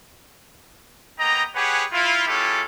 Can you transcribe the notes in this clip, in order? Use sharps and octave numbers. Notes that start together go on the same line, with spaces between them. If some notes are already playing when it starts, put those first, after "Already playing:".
A#3 B3 D#5 G5 A#5
G4 G#4 B4 C#5 F#5 G#5
E4 F4
G#3 C#4 E4 F4 G4 A4